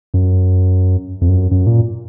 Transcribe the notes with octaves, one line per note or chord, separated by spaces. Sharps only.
F#2
F2
F#2
F#2
A#2